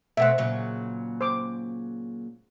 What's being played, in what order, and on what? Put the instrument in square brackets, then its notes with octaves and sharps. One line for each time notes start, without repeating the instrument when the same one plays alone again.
[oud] B2 A3 C4 [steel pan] E5 F#5
[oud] A#2 C#3 F#3
[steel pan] C5 D6